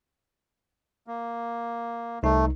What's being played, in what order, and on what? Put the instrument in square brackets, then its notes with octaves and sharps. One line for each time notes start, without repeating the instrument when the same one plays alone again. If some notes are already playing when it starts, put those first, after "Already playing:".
[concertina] A#3
[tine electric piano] C2 D#4 [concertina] A3